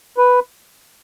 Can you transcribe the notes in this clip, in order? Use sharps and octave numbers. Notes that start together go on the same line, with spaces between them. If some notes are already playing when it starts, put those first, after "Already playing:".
B4